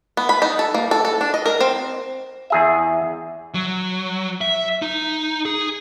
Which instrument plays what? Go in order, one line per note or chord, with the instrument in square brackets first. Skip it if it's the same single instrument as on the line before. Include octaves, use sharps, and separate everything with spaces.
[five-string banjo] B3
B5
D#4
A4
A#3
A4
A4
D4
D#5
A#4
C4
[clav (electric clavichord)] E2 G#4 E5
[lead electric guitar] F#3
E5
D#4
G#4